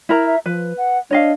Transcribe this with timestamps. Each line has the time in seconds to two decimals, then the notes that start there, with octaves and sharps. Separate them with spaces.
0.09 E4 A#4 A#5
0.25 E5
0.46 F3 B4
0.78 F#5
1.11 D4 C#5 D#5 F5